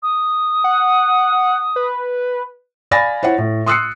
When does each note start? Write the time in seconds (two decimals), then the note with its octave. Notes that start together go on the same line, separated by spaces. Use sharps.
0.03 D#6
0.64 F#5
1.76 B4
2.91 D5 F5 G#5 B5 A6 A#6
3.23 E4 C5 C#5 F#5
3.38 A2
3.66 C6 D#6 E6 F#6 C7 C#7